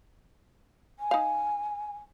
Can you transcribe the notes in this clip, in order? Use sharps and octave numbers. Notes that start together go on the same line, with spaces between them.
G#5
D#4 F5